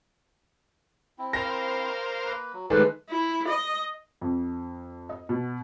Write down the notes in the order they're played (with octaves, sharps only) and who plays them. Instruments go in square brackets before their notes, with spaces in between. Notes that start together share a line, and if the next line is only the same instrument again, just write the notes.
[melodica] C4 E4
[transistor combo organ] A#4 C5 F5 [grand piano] A#6
[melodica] A#3 B4
F#3
[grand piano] D#3 G#3 A3 [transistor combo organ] A4 [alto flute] B4 [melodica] C5 D5 G#5
[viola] E4
D#5
[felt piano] F2
D#5
B2